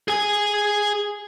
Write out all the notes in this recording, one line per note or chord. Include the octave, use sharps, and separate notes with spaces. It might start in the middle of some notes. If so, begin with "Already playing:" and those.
G#4 G#5